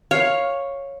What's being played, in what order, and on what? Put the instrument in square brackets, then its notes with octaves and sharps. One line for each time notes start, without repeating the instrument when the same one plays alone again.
[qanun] C#5 [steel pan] F5